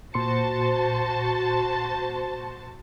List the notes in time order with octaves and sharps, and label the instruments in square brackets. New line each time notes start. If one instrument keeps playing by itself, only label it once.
[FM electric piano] A#2 C6 C#7 [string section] F#4 C5 A5